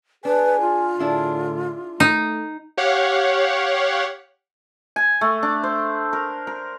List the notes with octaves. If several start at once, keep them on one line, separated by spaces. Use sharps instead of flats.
D4 G#4 B4 G#5
F4
A2 D3 D4 E4 G#4
A3 D#4
G4 C#5 F5 F#5
G#5
A3
D4
C5
A#4
A#4